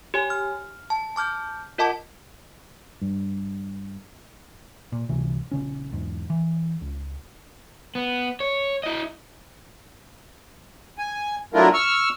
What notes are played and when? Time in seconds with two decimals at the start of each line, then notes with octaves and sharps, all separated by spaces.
0.14 G4 C#5 G#5
0.30 F6
0.90 A5
1.16 A5 D6 F6 G6
1.78 F4 A#4 D#5 F#5 A5 D6
3.02 G2
4.92 A#2
5.09 G1 C#2 C3 E3
5.51 A#1 C#3 C#4
5.92 E2 G#2
6.30 E3
6.81 C#2
7.95 B3
8.40 C#5
8.84 E4 D#5
10.98 G#5
11.54 F#3 A3 D4 E4 F4 A#4
11.74 C#6 E6 F6